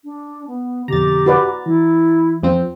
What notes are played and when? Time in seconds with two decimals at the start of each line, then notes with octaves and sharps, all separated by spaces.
0.05 D4
0.47 B3
0.88 F2 B2 D3 G4 A#5 A6
1.26 F#4 B4 D5
1.66 E3 E4
2.43 F2 F3 C4